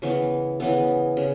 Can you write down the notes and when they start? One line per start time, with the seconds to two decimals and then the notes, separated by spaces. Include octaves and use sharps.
0.02 C#3 E3 B3
0.60 C#3 E3 B3
1.17 C#3